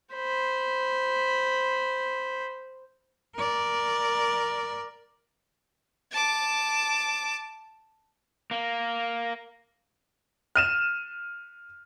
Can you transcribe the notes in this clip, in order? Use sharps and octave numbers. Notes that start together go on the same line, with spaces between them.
C5 B5
A#4 D5
A5 D6
A#3
F6 D#7 E7